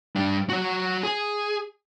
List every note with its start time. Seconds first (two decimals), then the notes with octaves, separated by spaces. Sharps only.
0.16 G3 D4
0.49 F#4 C#5
1.03 G#4